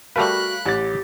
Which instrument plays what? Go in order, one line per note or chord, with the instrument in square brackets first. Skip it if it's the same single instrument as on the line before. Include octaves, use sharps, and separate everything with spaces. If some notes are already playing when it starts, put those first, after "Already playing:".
[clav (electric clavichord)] G3 A3 B4 [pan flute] F#4 [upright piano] A#4 F5 [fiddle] B5 F#6
[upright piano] A1 A6 [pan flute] G4